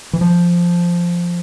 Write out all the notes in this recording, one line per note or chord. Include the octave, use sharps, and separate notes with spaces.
E3
F3